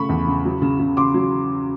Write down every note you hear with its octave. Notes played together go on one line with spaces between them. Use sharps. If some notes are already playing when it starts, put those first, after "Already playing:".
Already playing: C#3 A3 B5 C#6
E2
C#3
F#3
C#3
C#3
C#3 C6 D6
F#3